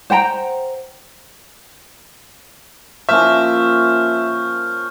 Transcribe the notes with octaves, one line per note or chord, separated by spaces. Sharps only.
C5 F#5 G5 A#5
F3 A#3 C#4 E5 C#6 F6 G6